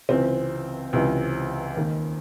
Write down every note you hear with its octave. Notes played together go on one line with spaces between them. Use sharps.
C#2 C3 E3 C4
C#2 C3 E3
D#2 D#3